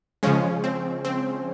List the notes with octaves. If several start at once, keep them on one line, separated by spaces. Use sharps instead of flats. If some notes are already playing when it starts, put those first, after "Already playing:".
C#3 F3 G#3 C#4
C4
C4